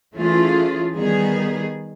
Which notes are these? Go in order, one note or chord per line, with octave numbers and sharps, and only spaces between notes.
E3 A3 C#4 F4 G#4
D#3 G3 B3 D#4 G#4